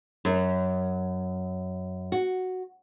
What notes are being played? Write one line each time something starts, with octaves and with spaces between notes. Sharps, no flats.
F#2
F#4